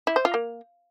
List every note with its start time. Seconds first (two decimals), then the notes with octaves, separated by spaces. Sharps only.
0.07 E4
0.16 C5
0.25 F4
0.34 A#3